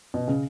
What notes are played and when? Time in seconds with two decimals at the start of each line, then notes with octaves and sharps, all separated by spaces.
0.14 B2
0.28 C#3